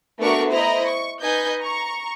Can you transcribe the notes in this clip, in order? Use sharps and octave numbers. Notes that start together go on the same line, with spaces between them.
A3 B3 D4 F#4 A#4 C#6
E4 C5 D#5 A#5
C#6
D#4 B4 D#5 G#5 G6
A#5 C#6